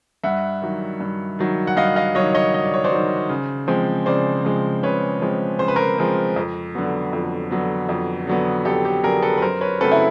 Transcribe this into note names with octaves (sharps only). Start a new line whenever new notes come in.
G2 E5 F#5
D#3 F#3
G2
D#3 F#3
F#5
G2 D#5 F5
D#5 F5
D#3 F#3 C#5 D#5
C#5 D#5
G2 D#5
D5
C#5
C5 D5
D#3 F#3
C#3
F3 G#3 C4
C#3 C5 D5
F3 G#3 C4
C#3 B4 C#5
F3 G#3 C4
C#3 C5
B4
A#4 C5
F3 G#3 C4
F2
D3 F#3 B3
F2
D3 F#3 B3
F2
D3 F#3 B3
F2 G4 A4
G4 A4
D3 F#3 B3 G#4 A#4
A4 B4
B4
F#2 A#4 C5
B4 C#5
C#3 F#3 A3 C4 A4 B4
E4